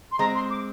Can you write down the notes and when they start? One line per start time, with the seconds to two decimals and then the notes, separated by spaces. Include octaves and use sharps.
0.12 C6
0.19 G#3 C4 A#5
0.35 C6
0.50 D6